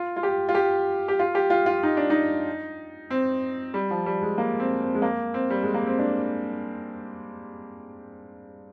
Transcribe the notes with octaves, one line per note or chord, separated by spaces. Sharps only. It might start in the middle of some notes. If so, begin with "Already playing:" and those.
Already playing: F4
F4
G4
F4
G4
G4
F4
G4
F4
F4
D#4
D4
D#4
C4
G3
F3
G3
G#3
A#3
C4
C4
G#3
A#3
C4
G3
G#3
A#3
C4
D4